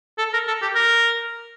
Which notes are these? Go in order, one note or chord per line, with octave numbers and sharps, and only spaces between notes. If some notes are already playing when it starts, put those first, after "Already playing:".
A4
A#4
A4
G4
A#4